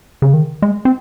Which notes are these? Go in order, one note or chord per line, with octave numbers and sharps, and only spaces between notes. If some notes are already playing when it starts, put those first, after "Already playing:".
C#3
D#3
G#3
C4